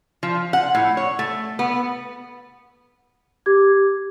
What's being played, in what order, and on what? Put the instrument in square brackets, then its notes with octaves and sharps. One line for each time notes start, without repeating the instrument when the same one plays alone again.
[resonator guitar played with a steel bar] F3
F#5
A2
C#5
A3
B3
[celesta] G4 D6 G#6